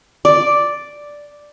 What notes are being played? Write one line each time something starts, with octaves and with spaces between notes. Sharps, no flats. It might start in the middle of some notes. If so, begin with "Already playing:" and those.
D5